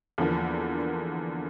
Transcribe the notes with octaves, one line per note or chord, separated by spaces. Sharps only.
E2 D3 F3 A#3